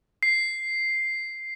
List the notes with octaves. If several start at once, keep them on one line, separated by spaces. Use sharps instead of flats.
C7